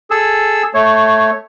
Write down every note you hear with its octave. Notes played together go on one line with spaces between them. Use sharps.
G#4 A4 E6
A3 C#5